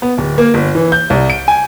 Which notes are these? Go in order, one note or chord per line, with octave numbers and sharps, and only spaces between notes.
B3
D1
A#3
G1
E3
G6
C2
D7
G#5